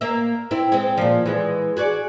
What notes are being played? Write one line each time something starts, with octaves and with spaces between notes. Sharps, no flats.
A#3 E5
C4 E4
G#3 C4
A#2 F3
E3 G#3
F#4 G#4 D5